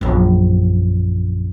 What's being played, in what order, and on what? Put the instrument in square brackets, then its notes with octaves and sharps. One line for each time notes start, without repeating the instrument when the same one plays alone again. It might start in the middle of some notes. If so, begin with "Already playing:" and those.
[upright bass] A#1 F#2